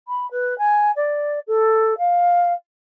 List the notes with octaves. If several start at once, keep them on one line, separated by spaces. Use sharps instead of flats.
B5
B4
G#5
D5
A4
F5